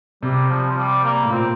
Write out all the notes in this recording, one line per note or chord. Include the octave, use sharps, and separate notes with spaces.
C3 G3
F3
F3
G3
A#3
A2
A#2 C4